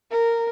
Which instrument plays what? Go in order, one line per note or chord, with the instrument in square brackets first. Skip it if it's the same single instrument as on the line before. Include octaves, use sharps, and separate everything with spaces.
[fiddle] A#4